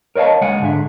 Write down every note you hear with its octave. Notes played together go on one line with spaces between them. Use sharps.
A#4 C#5 D#5 F5 A5
C#2 G#3 F5 F#5 G#5
G#2 D3 E5